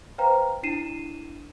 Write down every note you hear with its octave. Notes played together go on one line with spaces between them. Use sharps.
B4 C5 F5 G5 A#5
D4 E4 C7 D#7 E7